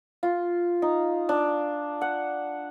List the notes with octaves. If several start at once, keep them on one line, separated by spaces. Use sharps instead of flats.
F4
D#4
D4
F#5